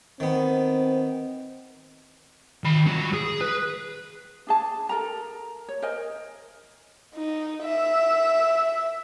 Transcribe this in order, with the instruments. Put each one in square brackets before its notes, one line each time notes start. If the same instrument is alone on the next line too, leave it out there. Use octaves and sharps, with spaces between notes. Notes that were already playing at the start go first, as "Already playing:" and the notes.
[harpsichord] D#3 B3 [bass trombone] C4
[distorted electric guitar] D#3 B5
G3 F#4
G#4
B4
[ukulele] D4 G#4 A5
A4 A#4 A#5
C#5
A#4 C5 D#5 G#5
[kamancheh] D#4
E5